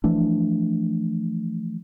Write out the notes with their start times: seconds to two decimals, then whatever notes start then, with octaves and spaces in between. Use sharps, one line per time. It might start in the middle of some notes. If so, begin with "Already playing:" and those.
0.04 E3 F3 A3 D4